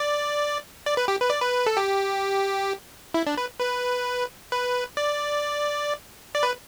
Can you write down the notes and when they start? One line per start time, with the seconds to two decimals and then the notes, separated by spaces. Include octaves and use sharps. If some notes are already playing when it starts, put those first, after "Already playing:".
Already playing: D5
0.86 D5
0.97 B4
1.08 G4
1.20 B4
1.30 D5
1.41 B4
1.66 A4
1.77 G4
3.14 E4
3.27 D4
3.38 B4
3.60 B4
4.52 B4
4.97 D5
6.35 D5
6.43 B4